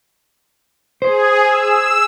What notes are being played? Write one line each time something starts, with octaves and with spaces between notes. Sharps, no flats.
G#4 C5
E6